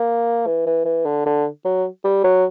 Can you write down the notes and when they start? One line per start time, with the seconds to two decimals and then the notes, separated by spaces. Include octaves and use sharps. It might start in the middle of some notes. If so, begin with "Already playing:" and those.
Already playing: A#3
0.46 E3
0.66 E3
0.85 E3
1.05 D3
1.26 D3
1.65 F#3
2.04 G3
2.24 F#3